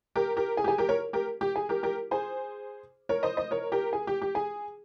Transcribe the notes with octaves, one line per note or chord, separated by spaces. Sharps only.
G4 A#4
G4 A#4
G#4
G4
G#4
G4 A#4
A#4 C#5
G4 A#4
G4
G#4
G4 A#4
G4 A#4
G#4 C5
A#4 C#5
C5 D#5
C5 D#5
A#4 C#5
G4 A#4
G#4
G4
G4
G#4